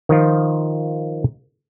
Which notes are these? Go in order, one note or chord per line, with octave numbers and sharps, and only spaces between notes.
D#3 F3 F4